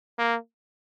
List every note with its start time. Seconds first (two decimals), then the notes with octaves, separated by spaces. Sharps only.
0.19 A#3